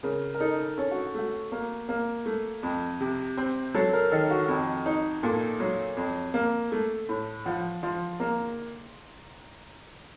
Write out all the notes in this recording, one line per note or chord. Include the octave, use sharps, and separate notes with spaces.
C#3 A#4
A#4
D#4 A4
C#4 A4
F#4
A3 F#4
A#3
A#3
A3
F2
C3
C4
F#3 A4
A#4
D#3 A4
F#4
F2
D#4
A#2 A4
F#3
F2
A#3
A3 A4
A2
F3 F#5
F3 C6
A#3 A#5